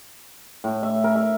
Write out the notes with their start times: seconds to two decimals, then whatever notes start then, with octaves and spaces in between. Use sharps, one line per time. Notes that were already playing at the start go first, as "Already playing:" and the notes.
0.64 A2
0.83 E5
1.04 A#4
1.16 E5